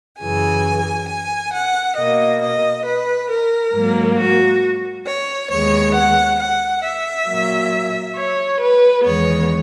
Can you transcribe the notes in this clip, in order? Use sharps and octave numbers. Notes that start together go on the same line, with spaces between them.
F#2 C#3 E3 G#5
G#5
F#5
B2 A#3 D#5
D#5
B4
A#4
G#2 F#3 A#3
F#4
C#5
D#2 D#3 G#3 B3 C#5
F#5
F#5
E5
A#2 F#3 A#3
C#5
B4
E2 D#3 G#3 B3 C#5